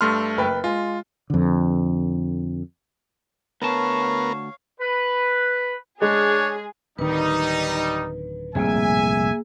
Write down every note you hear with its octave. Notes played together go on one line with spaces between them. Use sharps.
G2 A3 C6 F6
F#1 B4 G5
G#3 F4
F2 D3
D2 B3 A#4 C#5 F5 A5
B4
G#3 D4 G#4 C#5
D1 D#3 G3 D#4 B4
F1 C2 A#2 A#3 G#4 E5 G#5